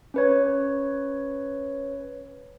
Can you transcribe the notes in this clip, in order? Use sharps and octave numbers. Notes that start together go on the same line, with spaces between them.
C#4 B4 C#5